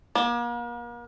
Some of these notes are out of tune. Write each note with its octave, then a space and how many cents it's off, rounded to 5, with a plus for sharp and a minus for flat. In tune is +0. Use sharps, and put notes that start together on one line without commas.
A#3 +40